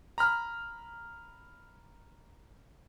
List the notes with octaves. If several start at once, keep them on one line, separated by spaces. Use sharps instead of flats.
A#5 B5 F6